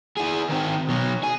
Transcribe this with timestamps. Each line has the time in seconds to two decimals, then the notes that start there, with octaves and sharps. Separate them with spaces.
0.17 E4 G#4
0.49 D#3 C4
0.89 B2 F#3
1.23 G#4